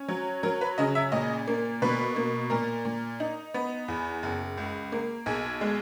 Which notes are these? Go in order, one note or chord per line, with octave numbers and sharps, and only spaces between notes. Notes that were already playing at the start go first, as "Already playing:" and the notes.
Already playing: C#4
F#3
F#3 A#4
B4
C#3 D#5
E5
A#2 D#5
A#3
B2 B4
A#3
A#2 A#4
A#2
D#4
B3
E2
F#1
C#2
A#3
B1 G#4
G#3